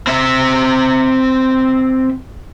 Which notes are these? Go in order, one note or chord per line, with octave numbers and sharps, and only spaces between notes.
C4 E5